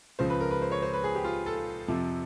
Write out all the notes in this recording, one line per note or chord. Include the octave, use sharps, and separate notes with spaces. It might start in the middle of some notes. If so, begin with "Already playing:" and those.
C#2 C#3 F3 C5
B4
A#4
B4
C5
C#5
C5
B4
G#4
G4
F4
A4
F2 C3 F3